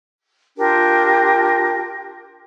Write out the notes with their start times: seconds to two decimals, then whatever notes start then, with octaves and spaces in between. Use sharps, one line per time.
0.57 D4 F4 G4 A#4